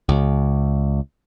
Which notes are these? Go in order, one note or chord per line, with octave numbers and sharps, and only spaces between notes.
C#2